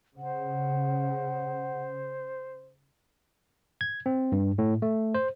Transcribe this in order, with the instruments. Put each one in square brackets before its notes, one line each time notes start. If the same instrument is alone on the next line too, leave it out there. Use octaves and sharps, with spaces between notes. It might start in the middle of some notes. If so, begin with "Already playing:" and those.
[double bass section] C#3 [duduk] C5 [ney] F#5
[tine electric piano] G#6
C4
G2
A2
A3
C5